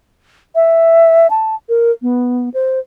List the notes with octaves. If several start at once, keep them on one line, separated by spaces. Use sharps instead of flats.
E5
A5
A#4
B3
C5